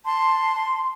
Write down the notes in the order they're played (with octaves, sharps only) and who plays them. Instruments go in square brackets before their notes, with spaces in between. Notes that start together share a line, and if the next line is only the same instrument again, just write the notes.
[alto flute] A5 [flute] C6